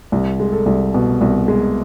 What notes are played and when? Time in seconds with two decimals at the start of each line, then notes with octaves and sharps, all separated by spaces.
0.12 C2
0.40 G#3
0.53 A4
0.66 C2
0.94 B2
1.21 C2
1.48 G#3